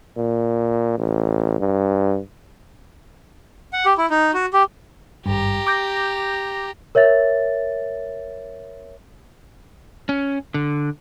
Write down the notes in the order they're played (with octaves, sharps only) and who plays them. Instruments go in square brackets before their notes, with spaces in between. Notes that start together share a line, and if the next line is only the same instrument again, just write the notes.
[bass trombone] A#2
A1
G2
[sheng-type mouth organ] F#5
G4
E4
D#4
F#4
G4
[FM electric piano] G#1 G2 [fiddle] G4 A#5
[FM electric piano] D6 G6 A#6
[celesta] A#4 C#5 E5 A6
[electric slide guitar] C#4
D3